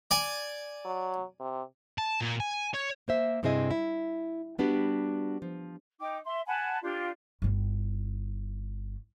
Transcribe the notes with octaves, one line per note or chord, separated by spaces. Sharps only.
D5 G#5
F#3
C3
A5
A#2
G#5
C#5
A#3 C5 E5
G2 C3 C4 E4 G#4 D#5
E4
G3 B3 D4 F#4 G4
F3
D#4 G5 D6
E5 C6
F#5 G#5 A5 B5
D4 F4 G4
G1 E4